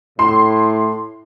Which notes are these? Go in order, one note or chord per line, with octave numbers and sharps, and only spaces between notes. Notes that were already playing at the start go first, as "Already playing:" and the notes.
A2 C6